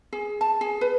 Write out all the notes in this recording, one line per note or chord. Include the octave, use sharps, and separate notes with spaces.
G#4
A5
G#4
B4